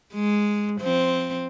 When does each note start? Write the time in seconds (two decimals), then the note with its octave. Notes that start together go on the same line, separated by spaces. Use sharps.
0.13 G#3
0.81 F3 C4